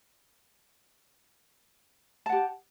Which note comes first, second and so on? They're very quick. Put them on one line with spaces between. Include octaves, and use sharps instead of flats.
A5 F#5 G4